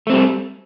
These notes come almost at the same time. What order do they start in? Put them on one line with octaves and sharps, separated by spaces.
A3 C4 G3